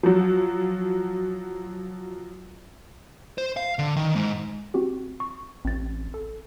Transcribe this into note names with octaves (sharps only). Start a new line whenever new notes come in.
F3 F#3
C5
F5
D3
D#3
G#2
C4 F#4 G4
C#6
A1 C4 A6
A4